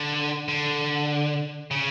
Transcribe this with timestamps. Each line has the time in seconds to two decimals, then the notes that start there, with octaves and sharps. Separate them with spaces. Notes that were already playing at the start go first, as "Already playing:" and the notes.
Already playing: D3
0.48 D3
1.71 C#3